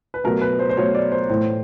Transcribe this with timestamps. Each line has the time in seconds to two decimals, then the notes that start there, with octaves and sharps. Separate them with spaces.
0.14 B4
0.24 B2 F#3 A3 A#4
0.41 B4
0.59 C5
0.69 C5
0.77 B2 F#3 A3 C#5
0.95 D5
1.12 C5
1.29 A2 E3 A3 C5